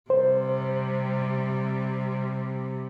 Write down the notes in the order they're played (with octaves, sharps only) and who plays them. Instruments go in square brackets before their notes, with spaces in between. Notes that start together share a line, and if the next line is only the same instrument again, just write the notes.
[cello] C3 G3 [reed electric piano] C5